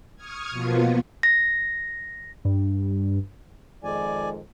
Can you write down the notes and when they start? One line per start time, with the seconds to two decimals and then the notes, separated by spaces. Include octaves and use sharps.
0.16 C#6 D#6 F6 G#6
0.51 B2 F3 A#3 B3 F4
1.23 A#6
2.45 G2
3.84 F2 D#3 G#3 D5 G#5